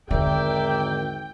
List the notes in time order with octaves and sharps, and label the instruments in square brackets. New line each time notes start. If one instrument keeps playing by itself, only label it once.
[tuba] G#1 [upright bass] E2 D3 [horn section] A#4 D5 E5 [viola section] G5